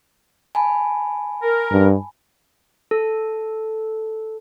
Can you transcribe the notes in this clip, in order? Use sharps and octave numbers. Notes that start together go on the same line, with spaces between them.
G#5 A5 B5
A#4
G2
A4